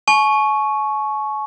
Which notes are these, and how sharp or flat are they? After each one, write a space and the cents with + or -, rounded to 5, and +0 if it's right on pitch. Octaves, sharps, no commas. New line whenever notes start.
G#5 +45 C#6 +0